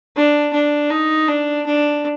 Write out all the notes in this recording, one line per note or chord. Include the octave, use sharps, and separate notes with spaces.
D4
D4
D#4
D4
D4